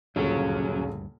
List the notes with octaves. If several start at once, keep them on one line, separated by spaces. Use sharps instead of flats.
D#1 D2 G2 C#3 F#3 C#4 F4